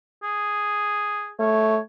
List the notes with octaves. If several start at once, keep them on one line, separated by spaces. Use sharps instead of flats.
G#4
A3 C#5